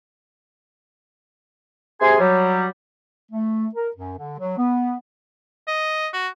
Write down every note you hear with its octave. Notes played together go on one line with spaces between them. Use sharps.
C3 G#4 G#5 C6
F#3 G3
A3
A#4
F#2
D3
F#3
B3
D#5
F#4